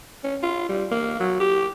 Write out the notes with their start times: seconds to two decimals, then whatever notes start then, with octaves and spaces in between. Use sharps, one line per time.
0.24 C#4
0.43 F4
0.69 G3
0.91 A#3
1.20 F#3
1.40 G4